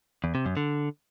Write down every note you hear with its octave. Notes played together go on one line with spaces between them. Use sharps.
E2
C3
F#2
D3